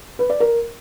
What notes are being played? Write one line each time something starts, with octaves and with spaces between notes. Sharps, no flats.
B4
D5
A#4